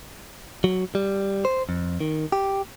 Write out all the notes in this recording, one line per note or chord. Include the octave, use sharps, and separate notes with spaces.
F#3
G3
C5
F2
D#3
G4